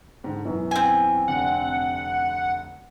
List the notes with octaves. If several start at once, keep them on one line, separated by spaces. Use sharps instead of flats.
G#2 D3
F#2 B2 E3
C4 G#5
F1 D3 F#5